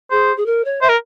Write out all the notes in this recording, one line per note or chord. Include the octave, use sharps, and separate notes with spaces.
G#4 C5
G#4
A#4
C#5
C5 E5
A#4